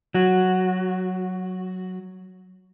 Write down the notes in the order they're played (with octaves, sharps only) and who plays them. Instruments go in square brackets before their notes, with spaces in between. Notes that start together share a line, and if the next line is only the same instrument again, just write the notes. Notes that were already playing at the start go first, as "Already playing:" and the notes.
[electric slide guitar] F#3 F#4